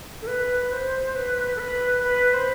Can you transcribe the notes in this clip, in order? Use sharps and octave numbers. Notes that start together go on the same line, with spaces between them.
A4
B4
C5
B4
A4
B4
B4
C5